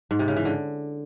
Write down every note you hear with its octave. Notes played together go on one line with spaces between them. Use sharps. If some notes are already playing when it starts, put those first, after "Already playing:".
G#2
C3
C#3
E3
D3